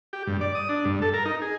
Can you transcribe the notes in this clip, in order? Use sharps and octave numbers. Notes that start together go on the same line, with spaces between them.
G4
G2
D5
D#6
D4
G2
A4
A#4
D#4
G#4